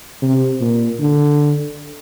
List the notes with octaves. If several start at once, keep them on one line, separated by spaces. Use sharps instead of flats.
C3
A#2
D3